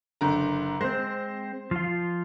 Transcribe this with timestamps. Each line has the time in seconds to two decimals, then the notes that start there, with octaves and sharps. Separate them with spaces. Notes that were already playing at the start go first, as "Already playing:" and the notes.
0.21 F#1 D3 A#5
0.81 G#3 C4 C5
1.71 F3 F4